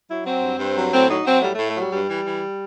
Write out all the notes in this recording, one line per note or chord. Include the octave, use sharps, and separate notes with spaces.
F#3 E4
F#3 C4
G2
G2
F#3
A2 C4
F#3 D#4
F#3 C4
A2 G3
A2 A3
A3
F#3 G3
G2 G3
E3
E3